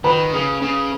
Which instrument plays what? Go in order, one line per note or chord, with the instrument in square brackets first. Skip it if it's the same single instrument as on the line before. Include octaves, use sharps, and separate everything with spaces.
[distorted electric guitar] D#3 [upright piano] B4 B5
[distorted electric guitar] C#3
C#3